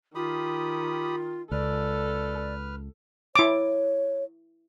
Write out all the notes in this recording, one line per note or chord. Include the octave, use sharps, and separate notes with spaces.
D#3 F4 G4 B5 D#6
C#2 A4 B4 D5 F6
E4 C#5 D6